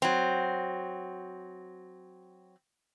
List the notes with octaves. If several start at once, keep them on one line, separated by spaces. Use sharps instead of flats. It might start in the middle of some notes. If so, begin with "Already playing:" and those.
F#3 C4